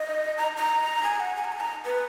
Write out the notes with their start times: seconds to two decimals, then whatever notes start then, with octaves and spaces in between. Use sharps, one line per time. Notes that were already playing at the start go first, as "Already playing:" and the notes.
Already playing: D#5
0.38 A#5
0.57 A#5
1.03 G#5
1.20 F#5
1.36 G#5
1.45 A#5
1.52 G#5
1.60 A#5
1.85 B4